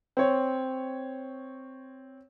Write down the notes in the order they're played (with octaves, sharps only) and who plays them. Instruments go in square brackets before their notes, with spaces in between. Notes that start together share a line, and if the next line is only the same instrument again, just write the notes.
[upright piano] C4 C#5